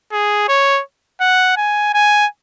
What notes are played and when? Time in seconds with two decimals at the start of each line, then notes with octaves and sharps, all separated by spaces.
0.12 G#4
0.48 C#5
1.21 F#5
1.57 G#5
1.94 G#5